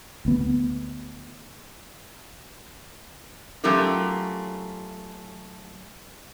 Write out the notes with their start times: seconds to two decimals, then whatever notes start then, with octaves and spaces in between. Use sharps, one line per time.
0.25 D2 B3
3.64 F#3 A3 C#4 F4 G4 A#4